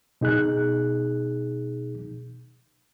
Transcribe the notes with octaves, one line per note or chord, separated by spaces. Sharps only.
B2 D#4 G#4 F#6